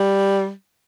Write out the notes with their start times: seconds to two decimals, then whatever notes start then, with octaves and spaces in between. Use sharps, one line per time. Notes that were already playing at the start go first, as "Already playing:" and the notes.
Already playing: G3